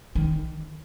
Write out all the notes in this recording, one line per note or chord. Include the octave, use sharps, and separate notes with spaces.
D#3